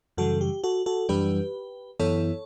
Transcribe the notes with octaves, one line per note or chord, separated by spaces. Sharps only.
F#2 C#3 E3 G3 F#4 A4
G4
F#4 A4
F#4 A4
F#2 E3 G3 D4 G4 B4
F#2 E3 B3 E4 A4 C#5